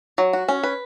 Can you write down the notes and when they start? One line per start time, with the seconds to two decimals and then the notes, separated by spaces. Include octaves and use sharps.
0.18 F#3
0.33 F#4
0.48 C#4
0.63 B4